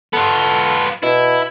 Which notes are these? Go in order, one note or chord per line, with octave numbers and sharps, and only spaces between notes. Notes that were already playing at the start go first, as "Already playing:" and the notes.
B3 F4 A4
B2 E4